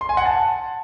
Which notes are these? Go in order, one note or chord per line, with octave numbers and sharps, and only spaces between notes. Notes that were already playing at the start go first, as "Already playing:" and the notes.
C6
G#5
F#5
A5